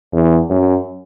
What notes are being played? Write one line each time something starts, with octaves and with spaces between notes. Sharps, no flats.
E2
F#2